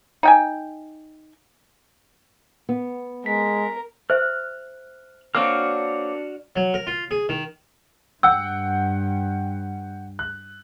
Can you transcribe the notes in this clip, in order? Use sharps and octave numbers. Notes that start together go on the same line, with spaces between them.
D#4 G5 G#5
B3
G#3 A#4 B6
C5 E5 F6 F#6
A#3 C4 D4 F#4 C#5 F6
F#3
A#4
F4
G#4
D#3
G2 F#5 G5 E6
F#6